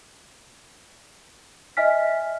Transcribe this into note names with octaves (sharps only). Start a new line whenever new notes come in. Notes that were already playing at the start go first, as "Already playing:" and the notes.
D#5 E5 G#5 F6 B6